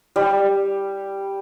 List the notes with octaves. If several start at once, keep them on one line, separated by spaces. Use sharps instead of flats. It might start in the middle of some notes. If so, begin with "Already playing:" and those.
G3